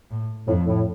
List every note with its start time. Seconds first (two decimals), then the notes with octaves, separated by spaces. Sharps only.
0.11 A2
0.47 F2 A2
0.65 A2